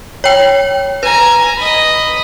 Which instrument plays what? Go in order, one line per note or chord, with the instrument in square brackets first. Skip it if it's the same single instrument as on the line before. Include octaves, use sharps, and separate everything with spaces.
[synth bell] C#5 G5
[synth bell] B4 [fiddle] G#5 A#5
[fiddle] D#5 B5